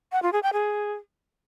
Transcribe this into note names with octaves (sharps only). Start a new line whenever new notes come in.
F#5
F4
G#4
G5
G#4